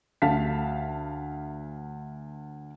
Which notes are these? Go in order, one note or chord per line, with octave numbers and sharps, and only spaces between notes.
D2 F5 A5 B6